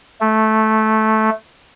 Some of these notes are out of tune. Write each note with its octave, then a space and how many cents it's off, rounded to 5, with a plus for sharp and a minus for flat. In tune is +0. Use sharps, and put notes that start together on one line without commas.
A3 -10